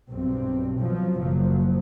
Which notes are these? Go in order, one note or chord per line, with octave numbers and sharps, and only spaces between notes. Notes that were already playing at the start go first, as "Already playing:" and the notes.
B1 G2 C4
B2 F3 F#3
F#1 F3 F#3